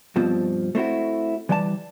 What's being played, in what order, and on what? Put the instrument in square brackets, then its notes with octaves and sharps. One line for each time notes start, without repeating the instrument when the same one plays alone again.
[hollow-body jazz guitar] G2 B2 F3 C4
A3 C4 E4 F#4
E3 G3 D5 F#5 A5